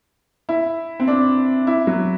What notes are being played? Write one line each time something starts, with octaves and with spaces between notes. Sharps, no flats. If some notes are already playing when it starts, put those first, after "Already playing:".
E4
C4
D4
E4
F#3